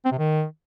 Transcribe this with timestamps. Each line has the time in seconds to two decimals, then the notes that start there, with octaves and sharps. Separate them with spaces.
0.05 C4
0.12 C3
0.18 D#3